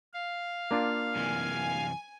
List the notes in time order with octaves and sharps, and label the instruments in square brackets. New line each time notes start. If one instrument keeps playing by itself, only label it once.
[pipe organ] F5
[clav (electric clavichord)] A#3 D4 F4
[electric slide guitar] F#2 C3 E3 [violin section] G#5